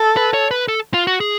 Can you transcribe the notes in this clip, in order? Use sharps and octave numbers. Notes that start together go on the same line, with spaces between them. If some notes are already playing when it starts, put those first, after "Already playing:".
Already playing: A4
B4
C#5
B4
A4
F4
F#4
G#4